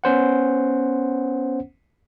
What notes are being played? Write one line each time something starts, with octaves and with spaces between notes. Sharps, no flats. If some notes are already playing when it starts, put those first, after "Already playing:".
B3 C#4 C5 F#5